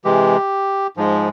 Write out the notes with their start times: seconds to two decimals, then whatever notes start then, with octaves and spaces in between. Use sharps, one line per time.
0.04 C3 E3 G#3 G4
0.97 G#2 F3 G#3